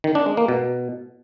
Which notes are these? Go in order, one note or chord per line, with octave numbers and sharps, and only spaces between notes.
D#3
D4
G#3
A#3
B2